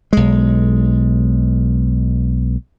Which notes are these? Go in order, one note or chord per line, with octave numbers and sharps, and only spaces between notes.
B1 G#3